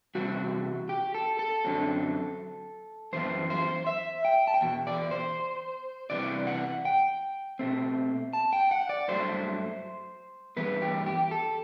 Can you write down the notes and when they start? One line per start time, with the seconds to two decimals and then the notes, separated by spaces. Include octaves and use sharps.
0.15 E2 C3 G3 C4 F#4
0.89 G4
1.14 A4
1.39 A4
1.64 F#2 D3 F#3 C4
3.13 F#2 E3 B3 C5
3.50 C5
3.87 E5
4.25 G5
4.47 A5
4.54 G5
4.61 E2 B2
4.87 D5
5.11 C5
6.10 C3 E3 G3 B3 D5
6.47 F#5
6.85 G5
7.59 B2 A3 C4
8.33 A5
8.53 G5
8.71 F#5
8.89 D5
9.08 G2 F#3 A3 C5
10.57 G2 E3 B3 B4
10.82 G4
11.06 G4
11.31 A4